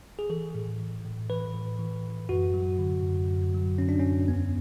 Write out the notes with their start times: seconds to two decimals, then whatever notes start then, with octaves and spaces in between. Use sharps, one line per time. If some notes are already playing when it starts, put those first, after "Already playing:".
0.19 G#4
0.30 E3 A4
0.55 A2
0.79 E3
1.05 A2
1.30 E3 B4
1.54 A2
1.79 E3
2.04 A2
2.29 F#2 F#4
2.54 F#3
2.79 D3
3.03 F#2
3.28 F#2
3.54 F#3
3.78 D3 C#4
3.89 D4
3.99 F#2 C#4
4.28 E2 B3